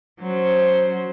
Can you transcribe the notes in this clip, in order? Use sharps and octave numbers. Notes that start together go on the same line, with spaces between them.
F#3 C#4 C5